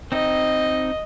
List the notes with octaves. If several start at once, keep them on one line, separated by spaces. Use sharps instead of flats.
C4 D#4 D#5